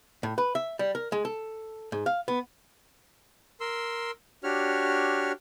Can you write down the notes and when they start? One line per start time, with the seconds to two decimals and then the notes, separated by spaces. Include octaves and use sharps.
0.23 A2
0.38 B4
0.55 E5
0.79 G3
0.95 A#4
1.12 G#3
1.25 A4
1.92 G#2
2.06 F5
2.28 B3
3.61 A#4 C6 E6
4.44 D4 F#4 G4 C#5 F6